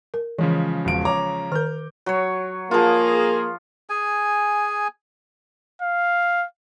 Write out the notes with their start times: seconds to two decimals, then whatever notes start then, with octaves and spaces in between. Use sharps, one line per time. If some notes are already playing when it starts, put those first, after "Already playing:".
0.14 A#4
0.38 C#3 E3 F3 G#3
0.85 E1 D7
1.05 C#5 A#5 D6
1.52 D#3 A#4 F6 G6
2.06 F#3 C#5
2.71 F3 A#3 F4 G#4
3.90 G#4 G#5
5.82 F5